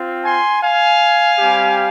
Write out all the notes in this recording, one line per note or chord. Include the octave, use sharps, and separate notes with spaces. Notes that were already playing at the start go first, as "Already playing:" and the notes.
Already playing: C4 F4
G#5 C6
F5 G#5
G3 C4 G4